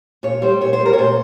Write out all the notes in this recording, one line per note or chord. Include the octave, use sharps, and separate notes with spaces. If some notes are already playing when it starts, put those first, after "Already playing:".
A#2 C#5
G3 C5
A#2 C#5
C5
G3
A#4
C#5
A#2 C5